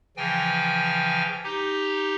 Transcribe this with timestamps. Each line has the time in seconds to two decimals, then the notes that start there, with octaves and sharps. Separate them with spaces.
0.17 C#3 E3 F3 G5 G#5
1.44 D#4 G4